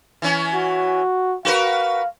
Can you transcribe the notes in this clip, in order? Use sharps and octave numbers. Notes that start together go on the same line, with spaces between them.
E3 C#4
F#4
F#4 A#4 B4 F5